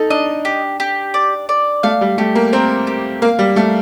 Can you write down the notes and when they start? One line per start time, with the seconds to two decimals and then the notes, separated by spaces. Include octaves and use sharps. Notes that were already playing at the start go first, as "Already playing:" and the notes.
Already playing: D#4 A4
0.10 D4 D#5
0.45 G4
0.80 G4
1.14 D5
1.49 D5
1.83 A3 F5
2.01 G3
2.18 A3 G4
2.35 A#3
2.53 C4 A#4
2.87 G4
3.22 A#3 F5
3.39 G3
3.56 A3 F5